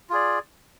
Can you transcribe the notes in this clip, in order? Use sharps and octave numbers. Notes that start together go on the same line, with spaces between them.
F4 G#4 D5